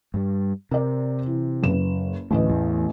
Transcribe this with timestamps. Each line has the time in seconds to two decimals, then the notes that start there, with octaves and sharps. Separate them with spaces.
0.14 G2 G3
0.71 C3 A#4 D5
1.26 E3
1.63 F#1 B4 E7
2.31 A1 D2 B4 D#5
2.50 E2 E3